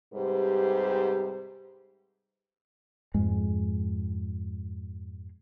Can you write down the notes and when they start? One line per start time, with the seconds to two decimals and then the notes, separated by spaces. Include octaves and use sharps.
0.13 G#2 C3 G3 G4 B4 C5
3.14 F2 G#2 G#3